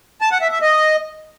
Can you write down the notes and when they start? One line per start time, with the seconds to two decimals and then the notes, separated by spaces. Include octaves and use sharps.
0.21 A5
0.32 F#5
0.42 E5
0.52 E5
0.62 D#5